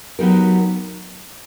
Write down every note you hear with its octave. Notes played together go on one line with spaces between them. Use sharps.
F#3 B3 D#4 G4 A#4